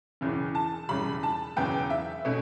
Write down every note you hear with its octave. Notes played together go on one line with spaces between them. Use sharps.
E1 E2 C#3 E3
A5
E1 E2 C#3 G3 B5
A5
E1 E2 C#3 F#3 B3 G5
E5
B2 A3 C#4